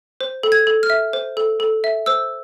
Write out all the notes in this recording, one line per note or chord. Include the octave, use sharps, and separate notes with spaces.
C5
A4
G#6
A4
F6
E5
C5
A4
A4
E5
C5 E6